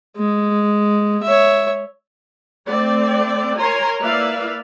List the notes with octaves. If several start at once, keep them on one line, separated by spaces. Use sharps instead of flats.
G#3
C#5 E5
A3 C4 D5
A#4 C#5 G#5 A#5 C6
A#3 E4 B4 D5 E5 F5